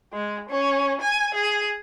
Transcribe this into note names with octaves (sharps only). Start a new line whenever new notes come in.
G#3
C#4
G#5
G#4